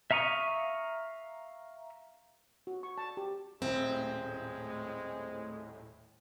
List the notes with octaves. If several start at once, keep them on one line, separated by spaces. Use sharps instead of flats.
E5 F5 A#5 C#6 D#6
F#4
C#6
A5
G4
D#1 A2 G#3 C4 E4